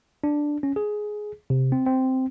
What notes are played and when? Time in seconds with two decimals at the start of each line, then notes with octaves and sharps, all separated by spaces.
0.24 D4
0.63 C#4
0.76 G#4
1.50 C3
1.72 C4
1.86 C4